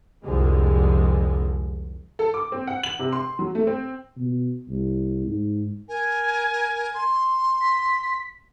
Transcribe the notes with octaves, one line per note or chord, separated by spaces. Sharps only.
C2 F2 D3 F3 G#3
A4
D6
C4
F#5
F#7
C3
C6
F#3
A3
C4
B2
C2
G#2
A#4 G#5
C6
B6